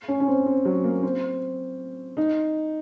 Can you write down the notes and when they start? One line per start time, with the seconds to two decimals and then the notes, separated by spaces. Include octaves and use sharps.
0.08 C#4
0.20 C#4
0.28 C4
0.46 C4
0.65 F#3
0.84 A#3
1.03 C4
2.17 D#4